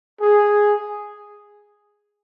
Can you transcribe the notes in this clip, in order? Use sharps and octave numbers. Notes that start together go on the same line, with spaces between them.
G#4